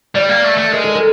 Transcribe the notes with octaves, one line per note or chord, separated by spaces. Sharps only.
G3 D5
A#3
A3
A3
G#3 A#4
A4
A#4